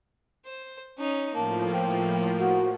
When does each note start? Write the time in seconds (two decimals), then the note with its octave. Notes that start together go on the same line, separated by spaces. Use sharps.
0.46 C5
0.98 C#4 D#4
1.35 A2 F3 A#3 A5
1.72 G5
2.40 F#4 F#5